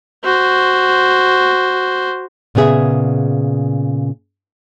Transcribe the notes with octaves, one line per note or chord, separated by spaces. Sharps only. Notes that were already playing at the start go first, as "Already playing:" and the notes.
F#4 C5
A#2 C#3 B3 G#4 E5